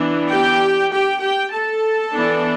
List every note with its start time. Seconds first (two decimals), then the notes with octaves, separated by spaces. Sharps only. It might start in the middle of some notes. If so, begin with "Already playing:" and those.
Already playing: E3 B3 D4
0.30 G4 G5
0.92 G4 G5
1.21 G4 G5
1.52 A4 A5
2.13 E3 B3 D4